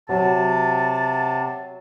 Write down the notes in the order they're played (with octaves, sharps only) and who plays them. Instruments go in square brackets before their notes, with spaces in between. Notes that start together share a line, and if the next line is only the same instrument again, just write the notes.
[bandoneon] C3 [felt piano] F#3 [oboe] A5